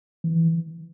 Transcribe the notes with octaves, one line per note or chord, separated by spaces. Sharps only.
E3